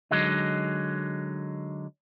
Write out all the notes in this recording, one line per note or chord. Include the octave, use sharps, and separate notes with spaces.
D3 F#3 G#3 D#4